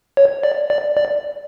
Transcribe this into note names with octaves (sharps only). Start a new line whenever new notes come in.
C#5
D5
D5
D5